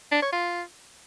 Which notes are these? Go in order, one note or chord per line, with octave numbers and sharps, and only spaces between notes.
D4
C#5
F4